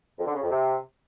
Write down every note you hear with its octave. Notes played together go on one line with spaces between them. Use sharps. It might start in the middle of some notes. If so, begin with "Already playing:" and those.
F2
D3
C#3
F2
C3